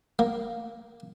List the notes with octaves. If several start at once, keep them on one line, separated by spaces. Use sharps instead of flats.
A#3